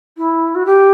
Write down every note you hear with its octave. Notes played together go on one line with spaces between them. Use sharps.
E4
F#4
G4